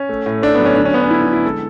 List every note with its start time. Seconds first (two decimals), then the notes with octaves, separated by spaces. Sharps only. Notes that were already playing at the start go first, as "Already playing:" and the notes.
Already playing: C#4
0.09 A3
0.26 A2
0.42 A3 D4
0.55 B3
0.60 F#3
0.65 C#4
0.76 D3 D4
0.85 C#4
0.94 D3 B3
1.02 C#4
1.10 D3 E4
1.22 E4
1.28 D3
1.33 E4
1.44 G#3 A4